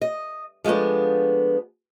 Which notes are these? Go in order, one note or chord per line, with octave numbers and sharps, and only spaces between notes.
D#5
F3 G#3 A3 B3 D4